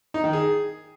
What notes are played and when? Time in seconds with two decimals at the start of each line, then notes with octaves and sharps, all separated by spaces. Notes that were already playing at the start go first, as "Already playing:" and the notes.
0.14 D#4
0.24 D#3
0.33 G#4